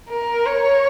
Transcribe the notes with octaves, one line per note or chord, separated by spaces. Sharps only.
A#4
C#5